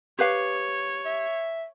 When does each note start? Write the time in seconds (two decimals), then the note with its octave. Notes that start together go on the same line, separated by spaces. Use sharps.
0.19 G4 B4 C#5 F5
1.05 E5